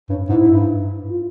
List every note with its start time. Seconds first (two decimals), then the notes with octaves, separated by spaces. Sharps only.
0.09 G2 C#4
0.29 G#2 E4
0.49 G2
1.09 F4